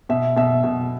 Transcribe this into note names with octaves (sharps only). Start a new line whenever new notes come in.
B2 E5
B2 E5
B2